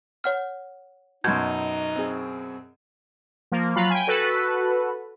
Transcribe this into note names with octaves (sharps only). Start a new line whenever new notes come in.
C#5 F#5 F6
F#2 B2 D#4 A5 B5 C6 G6 G#6
C4 G#4
F3 A#3
F#3 F4 F5 B5
G5 G#5
F#4 A4 B4